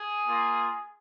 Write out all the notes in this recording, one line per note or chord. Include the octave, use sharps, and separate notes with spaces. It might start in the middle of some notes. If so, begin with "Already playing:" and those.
Already playing: G#4
A#3 F4